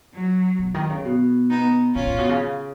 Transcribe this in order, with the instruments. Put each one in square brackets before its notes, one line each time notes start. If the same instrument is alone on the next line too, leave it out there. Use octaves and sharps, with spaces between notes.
[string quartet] F#3
[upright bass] B2
D#3
C#3
B2
[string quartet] B3 D#4
[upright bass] A#2 [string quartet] C#4 F4
[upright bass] A#2
B2
C#3